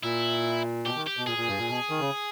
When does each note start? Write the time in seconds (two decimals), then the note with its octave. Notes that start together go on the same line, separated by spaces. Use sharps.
0.03 A#2 E4
0.86 B2 G4
0.96 D#3
1.07 G4
1.17 B2
1.27 A#2 G#4
1.38 A#2
1.48 G2
1.59 A#2
1.69 B2
1.90 D#3
2.00 C#3